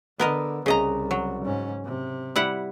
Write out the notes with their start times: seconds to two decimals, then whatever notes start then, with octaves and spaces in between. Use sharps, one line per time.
0.19 D3 B3 A#4 D#5
0.66 C2 C#3 D#5 A#5
1.11 F#3
1.44 G#2 C#4
1.85 C3
2.36 G3 E4 F#5